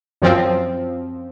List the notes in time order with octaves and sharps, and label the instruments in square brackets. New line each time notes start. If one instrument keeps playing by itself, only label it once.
[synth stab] F#2 F3 C4